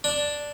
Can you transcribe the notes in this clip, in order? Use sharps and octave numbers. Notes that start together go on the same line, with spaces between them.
D4